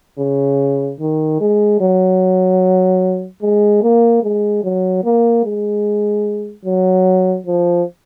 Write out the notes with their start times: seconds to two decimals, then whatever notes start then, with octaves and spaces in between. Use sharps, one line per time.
0.19 C#3
1.00 D#3
1.41 G#3
1.81 F#3
3.42 G#3
3.83 A#3
4.23 G#3
4.64 F#3
5.04 A#3
5.45 G#3
6.65 F#3
7.47 F3